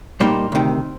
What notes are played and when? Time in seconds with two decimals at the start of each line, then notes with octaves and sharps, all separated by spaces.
0.20 A#2 G3 A#3 D#4 C5
0.52 D2 C3 D#3